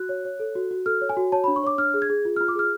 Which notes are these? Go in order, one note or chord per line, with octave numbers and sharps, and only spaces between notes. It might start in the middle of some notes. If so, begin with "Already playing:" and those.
Already playing: F#4 F#6
C#5
C#5
A4
F#4
F#4
A4 F6
C#5
G#5
F#4
C#5 A5
D4 B5
C#6
C#5 D6
D4 F6
G#4
G#6
G#4
F4
F4 F6
D6
G#4 F6